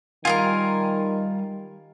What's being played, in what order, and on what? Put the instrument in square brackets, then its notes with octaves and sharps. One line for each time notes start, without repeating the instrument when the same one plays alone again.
[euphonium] D#3 [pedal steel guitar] G3 G#5 [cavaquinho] F4 G#4 A#4